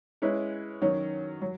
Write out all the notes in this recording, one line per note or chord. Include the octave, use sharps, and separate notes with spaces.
G#3 C#4 E4 B4
D#3 F#3 C#4
F#3